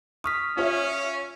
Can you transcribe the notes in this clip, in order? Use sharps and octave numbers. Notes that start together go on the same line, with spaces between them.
C#6 D#6 F6 B6
C#4 F4 C#5 E5